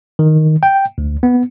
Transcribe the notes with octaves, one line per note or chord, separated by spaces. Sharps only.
D#3
G5
D2
B3